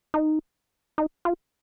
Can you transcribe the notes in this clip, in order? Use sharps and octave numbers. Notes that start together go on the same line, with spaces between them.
D#4
D#4
F4